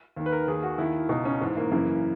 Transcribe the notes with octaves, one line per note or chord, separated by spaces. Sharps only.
D#2 D#3
B4
A#4
D#2 D#3 G#4
F#4
D#2 D#3 E4
C#2 B2 D#4
C#4
G#2 E3
A#3
F#2 C#3 E3 A#3